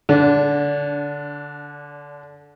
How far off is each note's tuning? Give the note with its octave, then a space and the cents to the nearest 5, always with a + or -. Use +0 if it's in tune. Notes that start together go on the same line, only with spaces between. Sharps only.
D3 -10 D4 -30